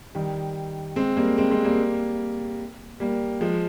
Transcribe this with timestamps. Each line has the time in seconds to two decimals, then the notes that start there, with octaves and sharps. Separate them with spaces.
0.15 D#3 G3
0.96 G#3 C4
1.17 G3 A#3
1.38 G#3 C4
1.51 G#3 C4
1.64 G3 A#3
3.00 G3 A#3
3.41 F3 G#3